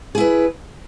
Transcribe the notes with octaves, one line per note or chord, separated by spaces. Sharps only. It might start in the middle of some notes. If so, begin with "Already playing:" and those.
E4 G#4 B4